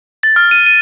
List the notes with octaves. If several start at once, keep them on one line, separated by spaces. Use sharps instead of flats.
A6
F6
D#7
D#7